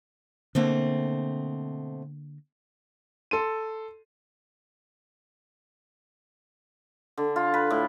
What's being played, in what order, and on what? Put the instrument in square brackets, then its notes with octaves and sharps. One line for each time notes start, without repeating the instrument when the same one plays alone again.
[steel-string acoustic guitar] B2 A3 C4 [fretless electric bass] D3 A#3
[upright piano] A4 C6 D#7
[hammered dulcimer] D3
F4
B4
A2